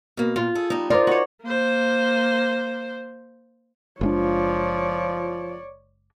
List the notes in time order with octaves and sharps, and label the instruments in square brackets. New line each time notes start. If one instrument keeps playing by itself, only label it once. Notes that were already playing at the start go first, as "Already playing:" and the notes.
[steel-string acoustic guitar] B2 A#3
[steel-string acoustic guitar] A#2 [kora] F4
[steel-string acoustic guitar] G#4 A4
[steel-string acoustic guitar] G3 B3 [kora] D#4
[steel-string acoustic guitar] G2 [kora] D#4 F4 A#4 [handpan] C5 D5
[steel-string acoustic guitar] D#4 [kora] F#4 C#5
[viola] A#3 C5
[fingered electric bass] F#1 G#3 D4 [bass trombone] F3 [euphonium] F4 [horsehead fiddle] C#5 D5